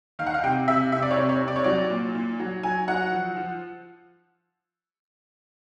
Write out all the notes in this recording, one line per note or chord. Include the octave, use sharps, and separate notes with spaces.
D#3 F5
F#5
F5
C3 G5
C3 E5
C3 E5
D5
C#5
C3
C#5
C3
D5
C#5
F#3 D5
A#2
A#2
F#3
F#3 G#5
F#3 F#5
F3
F3